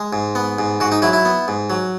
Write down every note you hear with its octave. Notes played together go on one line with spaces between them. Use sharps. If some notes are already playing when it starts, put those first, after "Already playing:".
Already playing: G#3
G#2
B3
G#2
G#2 F#4
D#4
F#3 E4
E4
B3
G#2
F#3